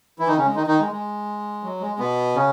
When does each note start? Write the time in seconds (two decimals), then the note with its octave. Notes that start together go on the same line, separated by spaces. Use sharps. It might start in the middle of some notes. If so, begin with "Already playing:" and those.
0.19 E3 E4
0.28 D#3 D#4
0.37 C#3 C#4
0.46 G#3
0.56 D#3 D#4
0.67 D#3 D#4
0.80 G#3
0.92 G#3
1.63 F#3
1.81 G#3
1.99 B2 B3
2.34 C#3 C#4